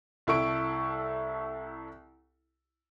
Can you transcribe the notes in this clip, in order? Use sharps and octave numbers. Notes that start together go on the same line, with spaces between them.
C2 E4 A4 C#6 D7